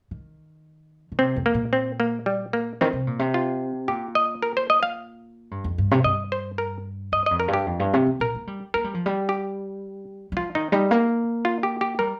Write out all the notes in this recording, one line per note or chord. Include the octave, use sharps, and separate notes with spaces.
D#3
D#3
C3 C4
F2
A#3
A#2
C4
A#3
G3
A#3
D#3 C4
C3
A#2
C3
F4
A#2 G4
D#5
A#4
C5
D#5
F5
G2
F2
G2
C3
G2 D#5
C5
A#4
G2 D#5
F2 D#5
A#4
G2
G4
F2
G2
C3
D#3
A#2 A#4
A#3
G3
A#3 A#4
G3
F3
G3
G4
G3
F3 F4
D#3 D#4
G3 D#4
A#3
F4
G4
G4
G3 A#4